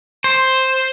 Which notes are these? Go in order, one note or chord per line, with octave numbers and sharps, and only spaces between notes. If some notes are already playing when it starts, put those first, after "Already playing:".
C5